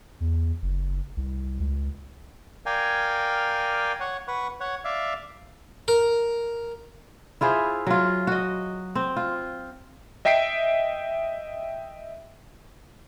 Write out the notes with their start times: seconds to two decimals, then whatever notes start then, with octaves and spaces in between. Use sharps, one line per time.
0.20 E2
0.62 F#1
1.17 C2
1.60 C#2
2.66 A#4 D5 F5 G5 G#5
4.00 C#5 F#5
4.28 B4 F#5 C#6
4.60 C#5 F#5
4.85 D5 E5 F5
5.88 A#4
7.41 E4 F4 G#4 C5
7.87 F#3 F4
8.27 F#4 D#5
8.95 C4
9.16 F4
10.25 D#5 E5 G5 B6 C7 D7